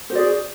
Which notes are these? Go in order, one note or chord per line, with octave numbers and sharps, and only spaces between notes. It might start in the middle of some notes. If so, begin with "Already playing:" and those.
F#4 G#4 C5 D5